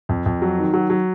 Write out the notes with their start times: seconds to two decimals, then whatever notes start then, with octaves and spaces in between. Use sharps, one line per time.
0.09 F2
0.26 F2
0.42 F#3
0.58 D#3
0.73 F#3
0.90 F#3